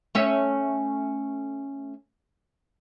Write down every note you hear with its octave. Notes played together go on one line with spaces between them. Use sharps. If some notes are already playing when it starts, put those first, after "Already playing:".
A3 C#4 E5